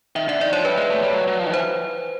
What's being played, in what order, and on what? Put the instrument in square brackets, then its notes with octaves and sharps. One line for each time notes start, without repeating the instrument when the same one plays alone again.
[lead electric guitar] D#3 [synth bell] E5
[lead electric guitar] D3 [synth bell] E5
[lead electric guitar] D#3 [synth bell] D5
[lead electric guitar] F3 [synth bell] C#5
[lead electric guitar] G3 [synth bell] B4
[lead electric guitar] G#3
A3
G3
F#3
F#3
F3
D#3
[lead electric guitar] E3 [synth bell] C5